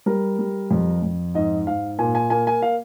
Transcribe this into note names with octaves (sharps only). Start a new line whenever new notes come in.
G3 A#4
G3
F2
F2
G#2 D#5
G#2 F5
A#2 G#5
G#5
A#3 G#5
G#5
F5